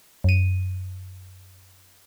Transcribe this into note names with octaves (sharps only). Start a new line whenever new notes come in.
F#2 D#7